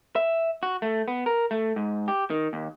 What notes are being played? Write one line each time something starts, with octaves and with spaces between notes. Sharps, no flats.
E5
F#4
A3
B3
A#4
A3
G#2
G4
D#3
D#2